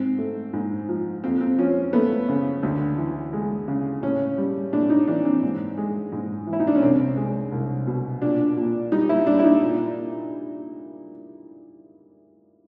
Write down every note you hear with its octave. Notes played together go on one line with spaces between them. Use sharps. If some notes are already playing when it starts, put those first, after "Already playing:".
Already playing: G#2 C4
A3
G#2
F3
F2 C4
C4
F3 C#4
A3 B3
C#3
D2
E3
G#3
C#3
A2 C#4
G3
A2 D4
D#4
E3 D4
C4
G#2
G#3
G#2
E3
E4
D#4
D4
C#4
C2 C4
G#3
C2
B2
A#2 D4
A#2
G3 D#4
E4
G3 D4
E4
D#4
A#2